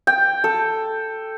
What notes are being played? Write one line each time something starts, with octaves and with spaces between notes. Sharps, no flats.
G5
A4